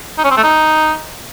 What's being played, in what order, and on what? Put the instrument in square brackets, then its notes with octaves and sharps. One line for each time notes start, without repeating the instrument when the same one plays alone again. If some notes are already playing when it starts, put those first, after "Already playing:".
[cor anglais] D#4
C#4
C4
A3
D#4